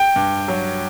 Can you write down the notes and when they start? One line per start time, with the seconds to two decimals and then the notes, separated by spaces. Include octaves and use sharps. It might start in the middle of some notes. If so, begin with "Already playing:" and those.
Already playing: G5
0.16 G2
0.48 F#3